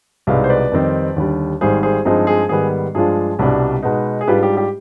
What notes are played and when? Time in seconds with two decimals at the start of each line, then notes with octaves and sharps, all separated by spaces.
0.27 C2 B2 G#3 B3 D#4 D5 F5
0.44 C5
0.49 B4 D5
0.72 F2 D#3 G3 C4 D#4
1.16 D#2 D3 G3
1.61 G#1 G#2 G3 G#4 C5
1.83 G#4 C5
2.05 G2 F3 G#3 C4 D#4 G#4
2.27 G#4
2.49 G#2 D#3 G3 B3 G#4
2.95 G2 F3 G#3 D4 F4 G#4
3.39 C2 B2 G3 D4
3.83 B2 G#3 B3 D#4
4.21 G#4
4.28 G#2 G3 D4 F4 G4 B4
4.43 G4
4.57 G4